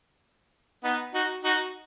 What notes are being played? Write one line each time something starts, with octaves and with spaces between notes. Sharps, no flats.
B3 D#4
D#4 F#4
D#4 F#4